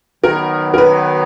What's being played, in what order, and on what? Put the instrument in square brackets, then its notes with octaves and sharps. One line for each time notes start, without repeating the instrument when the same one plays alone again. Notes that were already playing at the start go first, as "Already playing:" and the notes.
[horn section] D#3 F#3 B3 [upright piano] A#4
[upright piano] A#4
B4